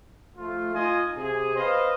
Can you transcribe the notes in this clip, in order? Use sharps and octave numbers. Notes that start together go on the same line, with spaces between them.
F3 A3 F4
D#4 F4 D#5 G#5
C3 G#4
B4 C5 D#5 F5